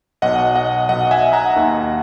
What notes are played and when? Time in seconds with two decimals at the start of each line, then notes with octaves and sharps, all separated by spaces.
0.22 B1 B2 D#5 F#5
0.56 D#5 F#5
0.89 B1 B2 D#5 F#5
1.11 E5 G#5
1.33 F#5 A#5
1.56 D#2 D#3